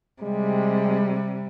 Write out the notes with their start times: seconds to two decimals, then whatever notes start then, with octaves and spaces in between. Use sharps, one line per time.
0.22 C3 G3 G#3